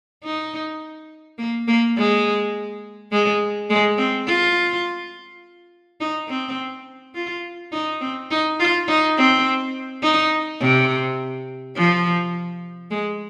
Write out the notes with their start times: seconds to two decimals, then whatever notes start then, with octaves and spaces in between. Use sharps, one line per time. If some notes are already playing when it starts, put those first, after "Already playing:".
0.24 D#4
1.38 A#3
1.68 A#3
1.97 G#3
3.12 G#3
3.70 G#3
3.98 C4
4.27 F4
6.00 D#4
6.28 C4
7.14 F4
7.72 D#4
8.01 C4
8.31 D#4
8.60 F4
8.88 D#4
9.17 C4
10.03 D#4
10.60 C3
11.76 F3
12.91 G#3